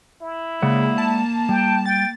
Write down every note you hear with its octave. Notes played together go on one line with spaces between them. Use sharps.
E4
C#3 G#3 A#3 D5 F#5
A5
G3 G5
G5 A6